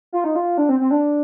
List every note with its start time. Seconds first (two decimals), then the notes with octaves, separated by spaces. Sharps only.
0.13 F4
0.24 D#4
0.35 F4
0.58 D4
0.69 C4
0.80 C4
0.91 D4